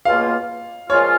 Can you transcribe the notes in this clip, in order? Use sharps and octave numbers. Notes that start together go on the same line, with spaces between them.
C#2 B2 A#3 F4 F5
A#2 F3 G#3 C#4 F4 C#5